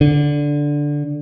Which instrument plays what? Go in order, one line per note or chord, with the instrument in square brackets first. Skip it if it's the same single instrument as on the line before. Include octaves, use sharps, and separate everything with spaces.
[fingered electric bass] D3